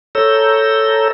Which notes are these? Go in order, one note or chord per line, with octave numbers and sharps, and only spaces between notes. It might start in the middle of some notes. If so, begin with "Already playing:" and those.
A4 C#5 A#5 E6 G6